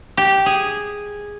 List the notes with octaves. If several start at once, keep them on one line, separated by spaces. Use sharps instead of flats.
G4
G#4